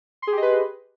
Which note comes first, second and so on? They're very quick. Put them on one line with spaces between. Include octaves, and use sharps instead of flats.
C6 G#4 G4 D#5 B4